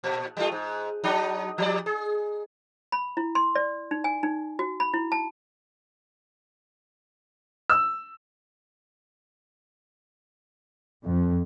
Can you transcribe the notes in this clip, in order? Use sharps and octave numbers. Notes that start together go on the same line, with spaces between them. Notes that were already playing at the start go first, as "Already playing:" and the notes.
A#2
G3 A3 F4
G#2
F#3 D4 D#4
F3 G3 D5
G#4
B5
E4
C6
D5
D#4
G#5
D#4
F#4
B5
E4
A5
E6
F2